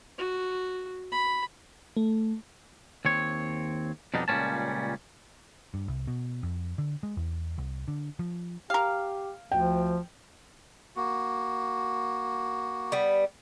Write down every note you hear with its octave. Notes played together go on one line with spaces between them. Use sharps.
F#4
B5
A3
D#2 C4 C#5
F2 B2 G3 D4 D#4
C#2 A#2 G3 C4 C#4 A5
G2
C2
B2
F2
D3
G#3
E2
C2
D3
F3
G4 A#4 F5
D2 F3 G5
A#3 F#4
G3 B3